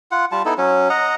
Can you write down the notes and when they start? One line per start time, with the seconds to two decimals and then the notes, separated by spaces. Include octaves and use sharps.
0.11 F4 F#5
0.32 G3 F4 A5
0.45 B3 D#4 E4 A4
0.58 F#3 C#4
0.90 D#5 F#5 A#5